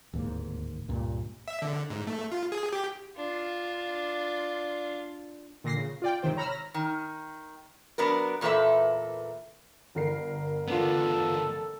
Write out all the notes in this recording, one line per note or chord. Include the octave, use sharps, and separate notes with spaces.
D1 D#2 G#2 A#3
C#2 G2 A#2
E5
D3
G#2
A3
F4
G#4
G4
D4 F4
A#2 D3 A#6 C7
C#3
F4 D5 G5
G#1 C3 D#3 C5 G5
C#5 A#5 B5 E6 F6
A#6
D#3
F#3 B3 D4 F#4 A#4
E2 A#2 A#3 A4 B4 E5
G1 A#4 C7
C#3 A3 B3 D4 F4 A4